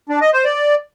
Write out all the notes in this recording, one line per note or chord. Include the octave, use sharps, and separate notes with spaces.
D4
D#5
C5
D5